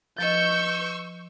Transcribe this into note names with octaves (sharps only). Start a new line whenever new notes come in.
F3 B4 D#5 C#6 E6 G6